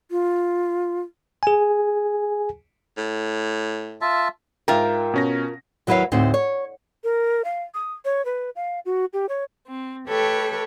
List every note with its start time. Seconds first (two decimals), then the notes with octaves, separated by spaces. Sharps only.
0.11 F4
1.43 G#4 G#5
2.97 A2
4.01 F4 E5 A5
4.68 G#2 F4 A#4 E5 G5
5.14 B2 C#4 A#6
5.87 D#2 F#3 E4 B4 C#5 F5
6.12 D2 A2 C4 D#4
6.34 C#5
7.04 A#4
7.45 F5
7.74 D#6
8.05 C#5
8.25 B4
8.56 F5
8.86 F#4
9.13 G4
9.29 C#5
9.67 C4
10.08 A3 G4 A4 B4 C#5 G5